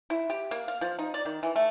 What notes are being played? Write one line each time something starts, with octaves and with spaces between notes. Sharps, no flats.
E4
G4
A#3
F5
F3
D#4
D5
D#3
E3
A3